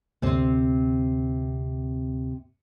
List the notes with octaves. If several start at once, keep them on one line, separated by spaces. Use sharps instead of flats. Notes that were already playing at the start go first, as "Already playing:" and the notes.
D2 C3 C4